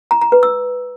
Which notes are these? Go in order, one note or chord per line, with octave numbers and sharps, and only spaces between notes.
A#5
A#5
B4
E6